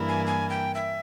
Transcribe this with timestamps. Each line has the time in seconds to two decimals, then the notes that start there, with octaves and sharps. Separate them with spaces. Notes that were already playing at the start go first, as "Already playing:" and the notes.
Already playing: G2 E3 A#3 E4 A#4
0.09 G#5
0.26 G#5
0.50 G5
0.75 E5